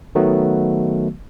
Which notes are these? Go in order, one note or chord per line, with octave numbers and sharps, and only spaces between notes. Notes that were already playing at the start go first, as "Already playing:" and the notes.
D#3 F#3 A3 B3 F#4